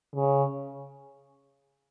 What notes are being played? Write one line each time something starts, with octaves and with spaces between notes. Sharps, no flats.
C#3